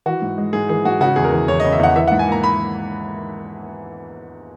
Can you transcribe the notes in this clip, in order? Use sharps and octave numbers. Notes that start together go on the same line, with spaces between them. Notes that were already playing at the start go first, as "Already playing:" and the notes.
E3 F#4
G#2
G#3
G#2 G#4
E3 G#4
G#2 F#4
C#3 F#4
E2 G#4
A#4
E3
E2 C#5
C#3 D#5
E5
E2 F#5
E3 E5
G#2 F#5
G#5
A#3 A#5
B5